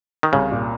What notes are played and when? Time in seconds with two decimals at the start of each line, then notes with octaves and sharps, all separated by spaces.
0.23 D#3
0.33 C2 C#3
0.51 A#2